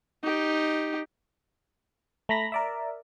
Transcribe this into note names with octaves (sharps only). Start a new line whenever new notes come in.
D#4 G4
A3 A#5 B5 A#6
A#4 D5 E5